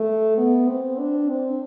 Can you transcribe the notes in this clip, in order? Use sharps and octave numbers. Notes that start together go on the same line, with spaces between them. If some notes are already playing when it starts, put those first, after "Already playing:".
Already playing: A3
B3
C4
D4
C4